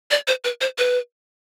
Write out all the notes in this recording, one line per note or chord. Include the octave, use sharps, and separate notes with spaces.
D5
C5
B4
C5
B4